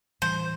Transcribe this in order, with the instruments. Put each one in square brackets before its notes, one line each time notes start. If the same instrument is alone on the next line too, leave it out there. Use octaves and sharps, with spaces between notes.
[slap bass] A2 E3 G3 [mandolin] C5